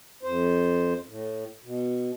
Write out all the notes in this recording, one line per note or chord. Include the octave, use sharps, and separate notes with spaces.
F2 C5
A2
B2